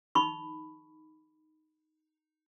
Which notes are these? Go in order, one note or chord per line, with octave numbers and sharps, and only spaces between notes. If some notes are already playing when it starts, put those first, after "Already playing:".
D#4 B5 C#6